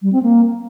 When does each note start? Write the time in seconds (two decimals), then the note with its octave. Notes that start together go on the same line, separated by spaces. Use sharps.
0.02 G3
0.12 C4
0.23 A#3